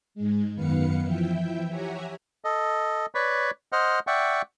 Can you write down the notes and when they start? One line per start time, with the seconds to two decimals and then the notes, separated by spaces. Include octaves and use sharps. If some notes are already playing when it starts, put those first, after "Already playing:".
0.15 G#2 G#3
0.55 F#2 D#3 B3 B4 F5 C#7
1.03 E3 F3 E4 E5 G5
1.69 G4 C#5 E5 F#5 G#5 A#5
2.44 A4 D#5
3.15 B4 C#5 D5 B5
3.72 C5 D#5 F#5 F6
4.07 D5 E5 F#5 G5 C#6